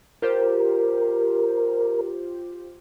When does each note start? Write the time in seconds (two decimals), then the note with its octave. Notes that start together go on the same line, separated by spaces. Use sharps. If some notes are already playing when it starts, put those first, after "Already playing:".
0.22 F4 G4 A#4 C5